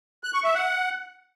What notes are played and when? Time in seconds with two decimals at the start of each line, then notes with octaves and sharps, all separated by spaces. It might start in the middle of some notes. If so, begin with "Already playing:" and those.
0.24 F#6
0.34 C#6
0.44 E5
0.54 F#5